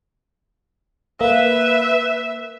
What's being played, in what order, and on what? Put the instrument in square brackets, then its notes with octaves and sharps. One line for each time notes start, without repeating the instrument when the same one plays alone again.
[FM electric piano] A#3 [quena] B4 [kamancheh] E5